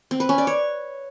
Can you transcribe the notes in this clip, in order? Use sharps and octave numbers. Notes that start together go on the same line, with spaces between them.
C4
B4
C#4
D5
C#5